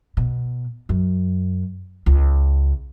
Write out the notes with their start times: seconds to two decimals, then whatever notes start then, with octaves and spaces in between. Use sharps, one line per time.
0.17 B2
0.89 F#2
2.06 C#2